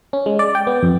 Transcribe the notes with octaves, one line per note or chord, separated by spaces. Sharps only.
C#4
G#3
D5
G5
B3
F2